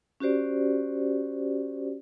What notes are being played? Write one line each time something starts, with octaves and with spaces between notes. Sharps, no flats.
C#4 F#4 G4 C5 D5